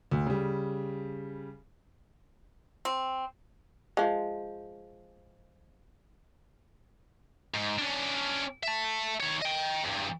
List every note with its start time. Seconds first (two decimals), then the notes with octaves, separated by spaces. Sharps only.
0.11 D2
0.26 C#3 G3
2.85 C4
3.97 F3 G#3
7.54 G#2
7.78 C#4 D4
8.63 E5 A5
9.20 D#3 C#5
9.42 D#5 G5
9.84 E2 G2